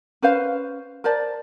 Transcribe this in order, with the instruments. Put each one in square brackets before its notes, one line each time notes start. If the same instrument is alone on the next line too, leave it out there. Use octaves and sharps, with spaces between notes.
[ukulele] C#4 B4 C5 F5
A#4 C5 D5 A5